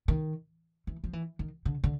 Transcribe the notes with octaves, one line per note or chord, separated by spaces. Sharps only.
D#3
E3
F3
E3
D#3
D3
D3